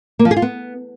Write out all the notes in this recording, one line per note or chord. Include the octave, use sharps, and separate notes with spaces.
A#3
F3
G#4
F4
B3